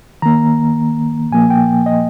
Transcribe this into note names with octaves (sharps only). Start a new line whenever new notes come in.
D#3 A#3 A#5
A#2 F3 A#3 G#5
G5
D#5